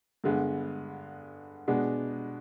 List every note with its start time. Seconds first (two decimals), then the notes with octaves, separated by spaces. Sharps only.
0.24 G2 D3 G#3 B3
1.68 B2 G#3 B3 D4